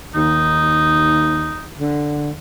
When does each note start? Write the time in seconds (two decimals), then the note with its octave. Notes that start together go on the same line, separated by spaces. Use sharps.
0.15 D#2 D#4
1.78 D3